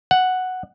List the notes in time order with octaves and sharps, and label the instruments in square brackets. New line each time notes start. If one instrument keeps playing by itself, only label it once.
[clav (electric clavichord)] F#5